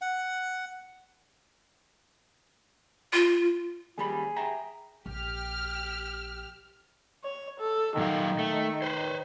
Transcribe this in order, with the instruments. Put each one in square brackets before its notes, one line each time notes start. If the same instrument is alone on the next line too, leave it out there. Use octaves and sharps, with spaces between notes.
[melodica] F#5
[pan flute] F4
[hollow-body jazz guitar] D#2 G3 B5 [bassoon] G#4
[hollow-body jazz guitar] E5 G5 A#5
[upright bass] A#1 [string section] G4 F6
[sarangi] C#5
A4
[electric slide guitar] A#2 F#3 F5 [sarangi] D#3
[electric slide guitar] A3
B4 C5